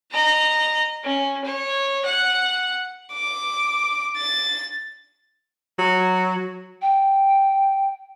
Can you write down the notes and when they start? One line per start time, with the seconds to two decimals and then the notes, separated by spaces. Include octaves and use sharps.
0.11 D#5 A#5
1.03 C#4
1.45 C#5
2.05 F#5
3.13 D6
4.17 A6
5.78 F#3
6.82 G5